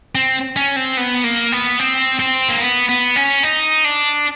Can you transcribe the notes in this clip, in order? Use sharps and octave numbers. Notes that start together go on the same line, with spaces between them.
C4
C#4
C4
B3
A#3
B3
C4
C4
A#3
B3
B3
C#4
D#4
D4